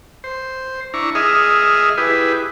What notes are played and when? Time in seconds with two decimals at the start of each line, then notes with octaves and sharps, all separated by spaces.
0.24 C5
0.94 D4 E4 A#5 C#6
1.15 G#4 D#5 E5 F6
1.98 E4 G4 G#4 B4